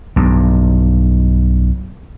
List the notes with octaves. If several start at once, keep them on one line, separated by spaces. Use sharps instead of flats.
B1 G2